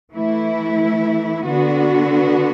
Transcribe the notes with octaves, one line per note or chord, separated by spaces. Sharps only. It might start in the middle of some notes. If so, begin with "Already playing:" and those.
E3 A3 E4
D3 B3 F#4